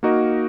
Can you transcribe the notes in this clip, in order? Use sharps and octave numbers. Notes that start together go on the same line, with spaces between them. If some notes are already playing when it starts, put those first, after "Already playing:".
A#3 D#4 F#4 A#4 D#5